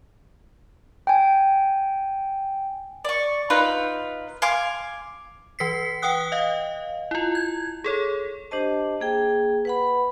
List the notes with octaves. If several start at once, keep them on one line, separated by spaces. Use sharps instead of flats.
G5 G#5
D5 C#6
D#4 F4 B4
F5 G#5 C6 D6
E3 B4 B6 C7
B4 F#5 G5 D#6 F#6
D#5 F5
E4 F4
G#6
G#4 A4 C#5
D4 G4 C5 D#5 A5
A#3 G#4 G5
B4 F#5 B5